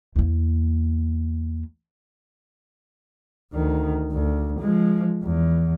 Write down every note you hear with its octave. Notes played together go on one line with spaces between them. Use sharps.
E2 A#3
D2 D#3
D2
F3 G#3
E2